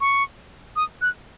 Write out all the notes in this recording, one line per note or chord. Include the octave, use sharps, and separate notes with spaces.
C#6
D#6
F#6